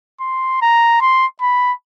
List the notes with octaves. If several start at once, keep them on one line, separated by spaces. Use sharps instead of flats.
C6
A#5
C6
B5